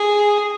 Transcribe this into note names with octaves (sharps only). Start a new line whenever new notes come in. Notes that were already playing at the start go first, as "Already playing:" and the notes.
Already playing: G#4